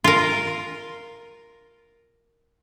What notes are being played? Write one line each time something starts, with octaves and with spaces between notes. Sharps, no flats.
F4 A#4